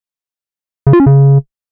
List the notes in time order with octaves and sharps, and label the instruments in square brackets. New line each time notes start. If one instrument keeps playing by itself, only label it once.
[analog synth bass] C#3
F4
C#4
C#3